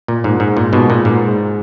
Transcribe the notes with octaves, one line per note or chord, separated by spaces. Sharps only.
A#2
G#2
G#2
A#2
G#2 B2
A#2
G#2